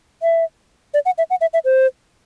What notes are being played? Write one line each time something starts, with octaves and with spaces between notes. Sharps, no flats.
E5
D5
F#5
E5
F#5
E5
E5
C5